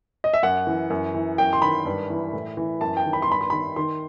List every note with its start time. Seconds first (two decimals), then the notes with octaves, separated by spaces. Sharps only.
0.24 D#5
0.34 E5
0.43 F#2 F#5
0.67 E3
0.90 F#2
1.14 E3
1.38 F#2 G5
1.53 C6
1.62 D#3 B5
1.85 G2
2.10 E3
2.33 A2
2.57 E3
2.81 F#2 A5
2.97 G5
3.05 D#3
3.13 B5
3.22 C6
3.29 G2 B5
3.41 C6
3.50 D#3 B5
3.76 D#3 C6